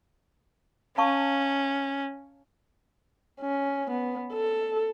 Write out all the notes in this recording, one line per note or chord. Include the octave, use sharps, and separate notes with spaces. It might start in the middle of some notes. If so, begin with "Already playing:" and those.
C#4 F5 A5 C#6
C#4
B3
A4